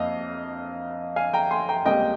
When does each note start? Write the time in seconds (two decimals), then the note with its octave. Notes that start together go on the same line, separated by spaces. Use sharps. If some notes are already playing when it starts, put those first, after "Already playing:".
Already playing: F2 A#3 D#5 F5
1.16 F5 G#5
1.33 G5 A#5
1.51 G#5 C6
1.69 G5 A#5
1.85 C#2 C3 G3 A#3 D#5 G5